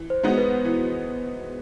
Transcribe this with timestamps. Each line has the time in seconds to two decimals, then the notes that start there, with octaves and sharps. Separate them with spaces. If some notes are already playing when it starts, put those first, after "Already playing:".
Already playing: E3
0.10 C5
0.23 G#3 B3 D#4 F#4
0.38 B4
0.65 E3